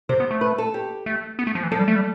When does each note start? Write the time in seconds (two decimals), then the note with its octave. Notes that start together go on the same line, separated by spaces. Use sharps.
0.09 C3 C5
0.20 B3
0.31 A3
0.41 B4
0.58 A4
0.74 G4
1.06 A3
1.39 B3
1.47 A3
1.55 F3
1.63 E3
1.71 F3 A4
1.79 G3
1.88 A3
1.96 G3